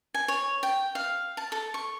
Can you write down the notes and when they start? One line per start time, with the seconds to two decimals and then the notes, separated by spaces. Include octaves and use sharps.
0.14 G#5
0.28 C#5
0.63 G5
0.95 F5
1.37 A5
1.52 A4
1.74 C#6